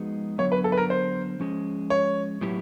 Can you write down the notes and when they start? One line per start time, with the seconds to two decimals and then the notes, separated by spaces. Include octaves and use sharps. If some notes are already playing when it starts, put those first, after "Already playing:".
Already playing: F3 G#3 B3 D#4 F#4
0.38 D3 F#3 B3 C#5
0.52 B4
0.64 A4
0.72 B4
0.77 A#4
0.90 C5
1.40 F3 G#3 C#4
1.90 C#5
2.41 A2 F#3 B3 E4 G4